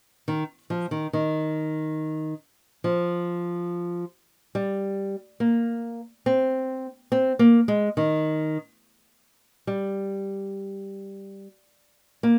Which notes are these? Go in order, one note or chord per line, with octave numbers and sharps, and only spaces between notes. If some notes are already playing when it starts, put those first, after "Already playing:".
D#3
F3
D#3
D#3
F3
G3
A#3
C4
C4
A#3
G#3
D#3
G3
A#3